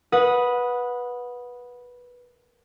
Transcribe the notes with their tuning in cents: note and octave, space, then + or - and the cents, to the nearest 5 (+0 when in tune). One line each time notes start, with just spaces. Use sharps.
B4 -10 F#5 -20 D#6 +0